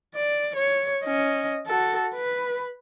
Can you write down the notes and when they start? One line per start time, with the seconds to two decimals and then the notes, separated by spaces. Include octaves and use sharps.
0.15 D5
0.55 C#5
1.04 C#4 D#5
1.67 F#4 A4
2.15 B4